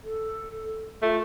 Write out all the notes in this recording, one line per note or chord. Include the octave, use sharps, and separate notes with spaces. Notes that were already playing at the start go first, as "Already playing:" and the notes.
A4
A3 F4